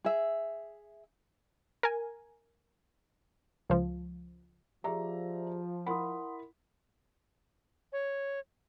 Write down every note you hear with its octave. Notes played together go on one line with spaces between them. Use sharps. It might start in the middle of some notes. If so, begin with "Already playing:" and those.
G#4 E5
A#4 G#5
C#2 F3
F3 G4 G#4 D5 E5 A#5
E4 A#4 F#5 B5 C6 D#6
C#5